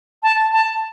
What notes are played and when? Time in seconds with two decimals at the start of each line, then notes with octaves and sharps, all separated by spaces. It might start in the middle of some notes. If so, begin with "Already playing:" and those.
0.23 A5
0.52 A5